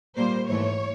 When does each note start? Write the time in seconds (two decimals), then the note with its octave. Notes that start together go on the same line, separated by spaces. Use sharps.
0.16 A#2 G3 A#3 C5
0.49 G#2 E3 A3 C#5